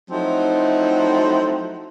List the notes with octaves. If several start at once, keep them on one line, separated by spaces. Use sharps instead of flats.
F3 F#3 A3 C4 D#4 E4